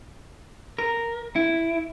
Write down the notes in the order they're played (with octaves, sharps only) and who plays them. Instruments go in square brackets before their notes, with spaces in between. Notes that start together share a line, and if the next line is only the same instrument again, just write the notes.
[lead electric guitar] A#4
E4